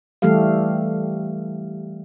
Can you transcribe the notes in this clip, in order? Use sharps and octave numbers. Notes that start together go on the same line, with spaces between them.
E3 G3 A3 G4 A4 F5